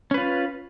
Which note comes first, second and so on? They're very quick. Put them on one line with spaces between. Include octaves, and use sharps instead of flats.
C#4 B4 F4